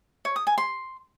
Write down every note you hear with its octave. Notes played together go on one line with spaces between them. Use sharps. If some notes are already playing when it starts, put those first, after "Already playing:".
C#5
D#6
G#5
C6